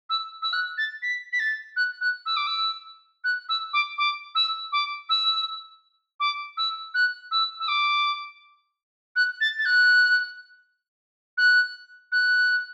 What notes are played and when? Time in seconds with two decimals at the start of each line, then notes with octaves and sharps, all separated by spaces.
0.10 E6
0.42 E6
0.53 F#6
0.78 A6
1.02 B6
1.33 B6
1.39 A6
1.76 F#6
2.01 F#6
2.26 E6
2.37 D6
2.47 E6
3.24 F#6
3.49 E6
3.73 D6
3.98 D6
4.35 E6
4.72 D6
5.09 E6
6.20 D6
6.57 E6
6.94 F#6
7.31 E6
7.60 E6
7.68 D6
9.16 F#6
9.41 A6
9.58 A6
9.65 F#6
11.37 F#6
12.12 F#6